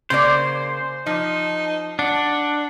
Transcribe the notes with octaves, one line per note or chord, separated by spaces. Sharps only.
C#3 A#3 C5 D5
F3 D#4
D4 F#5